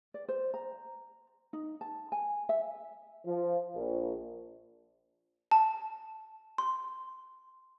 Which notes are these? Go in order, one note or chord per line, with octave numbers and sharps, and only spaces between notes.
D5
C5
A#5
D#4
A5
G#5
E5
F3
A#1
A5
C6